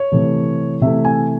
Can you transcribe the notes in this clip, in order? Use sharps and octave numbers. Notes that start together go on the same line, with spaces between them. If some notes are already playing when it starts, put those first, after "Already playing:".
Already playing: C#5
C3 E3 A3
C3 E3 A3 E5
G#5